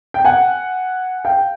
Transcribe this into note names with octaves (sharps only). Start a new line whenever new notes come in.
G5
F#5 G#5
F5 G5